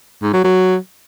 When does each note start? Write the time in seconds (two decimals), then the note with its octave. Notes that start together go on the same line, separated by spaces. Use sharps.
0.23 G#2
0.33 F#3
0.44 F#3